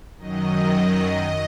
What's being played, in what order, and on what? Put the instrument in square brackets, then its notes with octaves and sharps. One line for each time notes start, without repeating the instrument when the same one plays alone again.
[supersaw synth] F#2 D#3 F#3 D#5